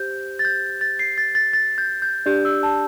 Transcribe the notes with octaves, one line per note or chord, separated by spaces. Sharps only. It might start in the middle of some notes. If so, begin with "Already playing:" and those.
Already playing: G4 C5 G6
A6
G6
A6
C7
A6
A6
A6
G6
G6
D4 G4 D5 G6
E6
A5